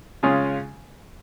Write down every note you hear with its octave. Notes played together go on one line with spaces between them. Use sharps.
C#3 G#3 C#4 F4 G#4